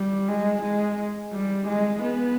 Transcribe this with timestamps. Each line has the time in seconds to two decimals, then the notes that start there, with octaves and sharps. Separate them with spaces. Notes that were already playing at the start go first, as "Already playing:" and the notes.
Already playing: G3
0.28 G#3
0.62 G#3
1.33 G3
1.68 G#3
2.03 B3